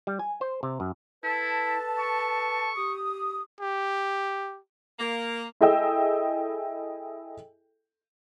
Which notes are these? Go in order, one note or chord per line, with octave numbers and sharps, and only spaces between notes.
G3
G#5
C5
C3
F#2
E4 A4 B4 A5
C#6
G4 D#6
G4
A#3
E4 G#4 A4 D#5 G5 E6